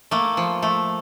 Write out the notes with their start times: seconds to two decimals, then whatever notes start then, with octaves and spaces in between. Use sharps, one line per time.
0.11 A3 A#3
0.37 F3
0.62 A3